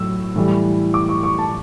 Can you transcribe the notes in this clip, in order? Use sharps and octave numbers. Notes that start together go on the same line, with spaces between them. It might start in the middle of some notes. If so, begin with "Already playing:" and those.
Already playing: A2 F#3 E6
A2 E3 G3
D6
C#6
C#6
A5